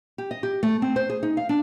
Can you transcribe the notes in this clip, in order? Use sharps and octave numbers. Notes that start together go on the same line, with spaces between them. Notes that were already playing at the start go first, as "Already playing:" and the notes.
G4
D#5
G4
A3
C4
C5
G#4
D#4
F5
D4